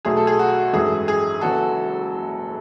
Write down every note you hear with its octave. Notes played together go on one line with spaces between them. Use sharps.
B1 A2 F#3 A3 G#4
A4
G#4
F#4
G#1 F#2 E3 A3 G#4
G#4
F#1 F#2 E3 F#4 A4